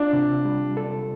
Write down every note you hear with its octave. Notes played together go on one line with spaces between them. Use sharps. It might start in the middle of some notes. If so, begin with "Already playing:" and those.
Already playing: D4 F4
C3
G3
A4